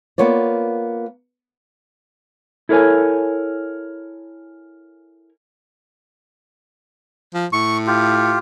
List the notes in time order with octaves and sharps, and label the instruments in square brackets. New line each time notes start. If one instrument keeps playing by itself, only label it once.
[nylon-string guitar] A#3 B3 F4 C#5 D5
[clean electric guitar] E4 A4 A#4 C#5 G#5
[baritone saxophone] F3
[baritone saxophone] A2 [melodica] C#6
[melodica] F4 G4